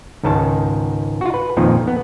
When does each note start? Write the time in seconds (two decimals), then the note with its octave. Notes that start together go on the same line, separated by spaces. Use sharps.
0.24 C#2 G#2 D#3 A5
1.21 F4 F#4
1.34 B4
1.57 F2 A#2 D#3 F3
1.87 B3